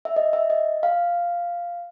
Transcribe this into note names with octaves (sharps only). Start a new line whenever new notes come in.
E5
D#5
E5
D#5
F5